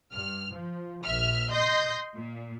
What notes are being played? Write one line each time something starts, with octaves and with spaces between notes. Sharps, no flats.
G2 F6
F3
A#1 E5 F6
D#5 C6 G6 A#6
A#2